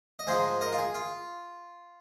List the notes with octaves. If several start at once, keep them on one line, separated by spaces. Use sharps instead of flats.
D#5
G#2 F3 G#3 D#4 G#4 C5
A#4 D#5
F4
G#4
F4